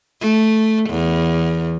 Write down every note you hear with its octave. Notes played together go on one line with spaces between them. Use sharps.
A3
E2